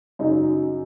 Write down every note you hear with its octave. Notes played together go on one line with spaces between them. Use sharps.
F#2 C#3 F#3 D#4